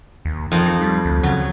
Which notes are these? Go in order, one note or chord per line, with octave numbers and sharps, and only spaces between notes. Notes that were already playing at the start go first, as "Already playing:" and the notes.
D#2
F2 D#4
D#4
G3
D2
C#3 F#3